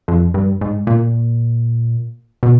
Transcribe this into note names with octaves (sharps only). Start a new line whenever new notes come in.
F2
G2
G#2
A#2
B2